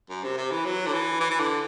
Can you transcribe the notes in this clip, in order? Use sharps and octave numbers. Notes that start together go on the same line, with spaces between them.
F#2
C3
C3
E3
F#3
D3
E3
E3
E3
D3